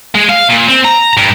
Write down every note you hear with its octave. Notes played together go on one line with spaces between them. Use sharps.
G#3
F5
A#2
C4
A#5
G2